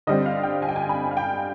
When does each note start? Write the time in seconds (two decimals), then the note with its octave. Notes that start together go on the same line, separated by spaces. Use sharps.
0.07 D3 G3 C4 D#5
0.26 F5
0.43 G5
0.62 G#5
0.69 G5
0.76 G#5
0.89 B5
1.11 F5
1.17 G5